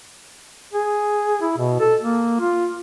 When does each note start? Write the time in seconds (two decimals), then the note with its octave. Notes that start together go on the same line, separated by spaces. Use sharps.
0.73 G#4
1.41 E4
1.58 B2
1.80 A4
2.01 A#3
2.40 F4